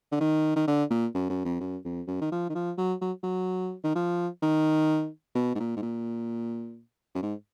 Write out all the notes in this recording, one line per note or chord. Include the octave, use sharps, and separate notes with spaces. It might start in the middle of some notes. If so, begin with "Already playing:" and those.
D3
D#3
D#3
D3
A#2
F#2
F#2
F2
F#2
F2
F#2
D#3
F3
D#3
F3
F#3
F#3
F#3
D#3
F3
D#3
B2
G#2
A#2
G#2
A#2
F#2
G#2